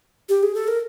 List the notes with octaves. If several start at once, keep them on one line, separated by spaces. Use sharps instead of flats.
G4
G#4
A4
A#4